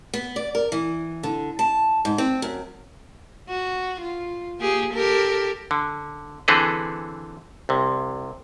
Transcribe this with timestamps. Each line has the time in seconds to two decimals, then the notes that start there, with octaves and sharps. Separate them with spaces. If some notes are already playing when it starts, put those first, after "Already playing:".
0.14 B3
0.36 D5
0.55 A#4
0.72 E3
1.23 D3
1.59 A5
2.05 G#2
2.18 C4
2.42 F#2
3.49 F#4
4.01 F4
4.60 A#3 G4 G#4
4.94 G4 A4 A#4
5.71 D3
6.48 D3 E3 C4 G#4 A4 B4
7.69 C2 C3